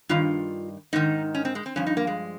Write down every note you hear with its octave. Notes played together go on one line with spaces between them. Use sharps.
G2 D#3 F4
G#2 D#3 D#4
C#4
C4
G#3
C4
G2 F3 C#4
D#4
A#3
G#3